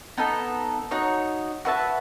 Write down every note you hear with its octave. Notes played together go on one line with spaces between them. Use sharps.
B3 D#4 A4
D#4 F#4 C#5
F#4 B4 E5 A5